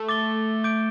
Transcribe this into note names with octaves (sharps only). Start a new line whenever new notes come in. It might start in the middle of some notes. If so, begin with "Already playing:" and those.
Already playing: A3
D6 A6 G7
D6 G6 D7